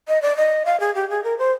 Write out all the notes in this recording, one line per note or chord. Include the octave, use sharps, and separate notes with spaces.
D#5
D5
D#5
F5
G#4
G4
G#4
A#4
C5